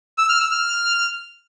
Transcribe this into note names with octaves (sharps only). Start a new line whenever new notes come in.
E6
F6
E6
F6